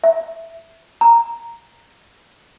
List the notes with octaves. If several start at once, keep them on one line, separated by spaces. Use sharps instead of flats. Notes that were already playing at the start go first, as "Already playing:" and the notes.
E5
A#5